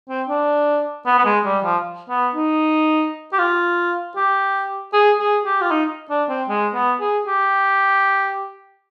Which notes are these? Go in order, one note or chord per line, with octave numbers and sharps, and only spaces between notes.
C4
D4
B3
B3
G#3
G3
F3
B3
D#4
G4
F4
G4
G#4
G#4
G4
F4
D#4
D4
C4
G#3
B3
G#4
G4